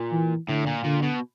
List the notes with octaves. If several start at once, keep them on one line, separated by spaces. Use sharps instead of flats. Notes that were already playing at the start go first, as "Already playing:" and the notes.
Already playing: A#2
E3
A2 D3
A#2
A#2 D3
B2